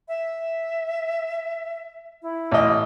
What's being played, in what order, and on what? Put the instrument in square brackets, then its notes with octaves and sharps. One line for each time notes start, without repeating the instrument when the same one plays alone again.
[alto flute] E5
E4
[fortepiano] A1 D#5